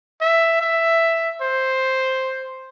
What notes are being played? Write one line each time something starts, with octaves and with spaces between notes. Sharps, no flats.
E5
E5
C5